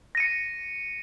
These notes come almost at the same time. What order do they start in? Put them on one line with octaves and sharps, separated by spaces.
A#6 D#7 C#7